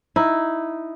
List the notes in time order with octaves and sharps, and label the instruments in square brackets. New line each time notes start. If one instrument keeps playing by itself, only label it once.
[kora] D#4 E4